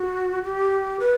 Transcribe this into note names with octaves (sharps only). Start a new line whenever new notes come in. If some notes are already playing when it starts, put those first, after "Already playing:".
Already playing: F#4
G4
B4